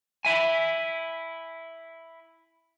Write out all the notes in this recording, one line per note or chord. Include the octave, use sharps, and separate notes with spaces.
E4 E5 G#5